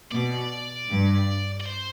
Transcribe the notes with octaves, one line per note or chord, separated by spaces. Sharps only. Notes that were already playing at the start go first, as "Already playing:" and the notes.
B2 D5
G2
D5
C5